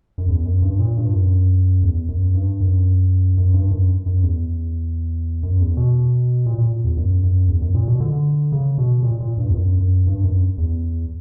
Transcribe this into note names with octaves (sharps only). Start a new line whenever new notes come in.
F#2
E2
F#2
G2
A#2
G2
F#2
E2
F#2
G2
F#2
F#2
G2
F#2
F#2
E2
F#2
E2
B2
A#2
A#2
E2
F#2
F#2
E2
F#2
A#2
B2
D3
C#3
B2
A#2
A#2
G2
E2
F#2
F#2
G2
F#2
E2